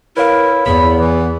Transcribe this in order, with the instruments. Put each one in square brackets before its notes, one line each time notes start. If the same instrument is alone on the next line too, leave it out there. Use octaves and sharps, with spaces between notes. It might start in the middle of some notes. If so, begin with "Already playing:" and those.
[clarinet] E4 [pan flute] A#4 [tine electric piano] B4 C#5 F5
[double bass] E2 [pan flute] B3 [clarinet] B5
[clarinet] E3